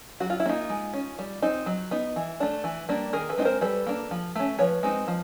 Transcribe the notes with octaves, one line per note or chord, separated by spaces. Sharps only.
F#3 F#4
F4
E4
A#3 C#4 D#4 F4
G#3
C#4
G3
C4 D#4
F#3
B3 D#4
E3
A3 D4
E3
G3 A#3 D4
D#3 G#4 A#4
A4 B4
G#3 C4 D#4
A#4 C5
G3 A4 B4
A#3 D4
F3
A3 C#4
F3 B4 C#5
G#3 C4 D#4
F3